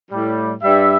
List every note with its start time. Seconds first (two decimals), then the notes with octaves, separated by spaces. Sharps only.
0.10 A2 G3
0.62 G2 G3 E5